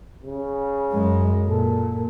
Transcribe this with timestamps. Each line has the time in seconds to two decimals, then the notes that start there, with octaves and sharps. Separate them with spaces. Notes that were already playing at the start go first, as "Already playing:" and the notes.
0.23 C#3
0.92 F#2 G#3
1.48 A#2 A4